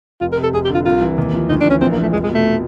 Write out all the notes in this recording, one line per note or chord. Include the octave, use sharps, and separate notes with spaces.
F1 F4
A#4
C3
A4
F1 G#4
G4
D3
F4
C2 F4
E3
D#2
F3
D2 D#4
D4
E3 C#4
A#1 C4
A#3
F3 A3
F1 G#3
G#3
B2 A3